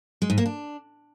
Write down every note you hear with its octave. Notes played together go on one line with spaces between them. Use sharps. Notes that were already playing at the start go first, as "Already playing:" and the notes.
G#3
G#2
A#3
D4